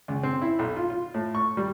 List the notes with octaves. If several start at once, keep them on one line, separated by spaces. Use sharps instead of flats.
C#2
C4
E4
B1
F4
F4
A2
C#6
G3